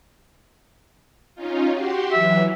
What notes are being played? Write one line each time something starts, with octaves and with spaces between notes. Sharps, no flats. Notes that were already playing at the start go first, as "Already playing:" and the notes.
C#4 D#4 F4
F#4 G4 C6
E3 F#3 E5